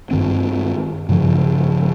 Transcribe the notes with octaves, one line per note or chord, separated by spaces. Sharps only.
G2 D#3 C4
G2 C#3 F3